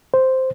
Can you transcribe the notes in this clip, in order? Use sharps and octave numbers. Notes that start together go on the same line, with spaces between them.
C5